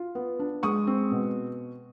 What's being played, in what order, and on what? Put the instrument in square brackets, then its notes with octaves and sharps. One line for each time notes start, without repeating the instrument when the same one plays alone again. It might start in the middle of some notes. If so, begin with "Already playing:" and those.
Already playing: [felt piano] F4
B3
D4
G#3 C#6 D#6
C4
B2